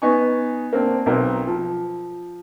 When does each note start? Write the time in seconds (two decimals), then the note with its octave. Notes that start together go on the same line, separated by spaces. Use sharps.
0.02 B3 D#4 G#5 C#6
0.73 A#3 C4 D4
1.06 B1 C4 A#4
1.47 F3